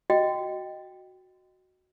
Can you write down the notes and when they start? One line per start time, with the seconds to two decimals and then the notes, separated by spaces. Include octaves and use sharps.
0.10 F#4 D#5 G5